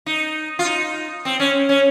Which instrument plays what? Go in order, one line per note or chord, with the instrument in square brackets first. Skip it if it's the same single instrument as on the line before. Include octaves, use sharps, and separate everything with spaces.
[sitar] D#4
F4
D#4
C4
C#4
C#4